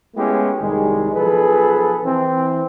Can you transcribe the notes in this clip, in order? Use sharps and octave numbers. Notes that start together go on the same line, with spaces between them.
G#3 A3 B3 C#4 E4 G4
C2 A2 D#3 G3 G#3
B1 F3 G#4 A4 B4
E3 C4